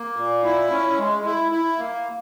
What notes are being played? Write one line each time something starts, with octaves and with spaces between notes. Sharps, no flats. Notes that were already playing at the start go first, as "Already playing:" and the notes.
Already playing: A#3
A#2
E4
C#4
G#3
E4
E4
A#3